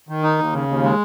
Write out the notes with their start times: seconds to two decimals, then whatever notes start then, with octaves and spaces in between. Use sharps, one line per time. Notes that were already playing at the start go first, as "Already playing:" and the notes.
0.09 D#3
0.23 D#4
0.39 D#2
0.53 C#3
0.68 D#2
0.83 G#3